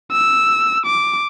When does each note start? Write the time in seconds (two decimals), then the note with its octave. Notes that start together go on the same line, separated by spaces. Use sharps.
0.12 E6
0.85 D6